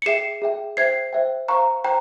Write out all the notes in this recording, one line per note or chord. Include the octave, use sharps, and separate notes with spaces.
C#7
G#4 E5 G5 C7 E7
G#4 E5 G5
C5 E5 G5 G#6 C7
C5 E5 G5
C5 F5 A#5 C#6
C5 G5 A#5